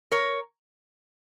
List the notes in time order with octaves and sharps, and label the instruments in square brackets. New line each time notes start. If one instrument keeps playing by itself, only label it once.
[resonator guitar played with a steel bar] A#4 C#5